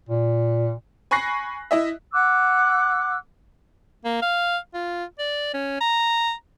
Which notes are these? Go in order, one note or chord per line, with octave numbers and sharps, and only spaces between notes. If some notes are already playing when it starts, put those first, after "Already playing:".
A#2
G#5 B5 C#6 F#6 A#6 C7
E4 D#5 E5
F#5 D6 E6 F#6
A#3
F5
F4
D5
C#4
A#5